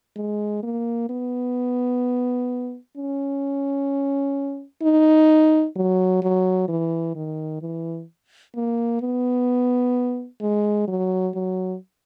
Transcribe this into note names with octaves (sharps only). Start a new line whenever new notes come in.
G#3
A#3
B3
C#4
D#4
F#3
F#3
E3
D#3
E3
A#3
B3
G#3
F#3
F#3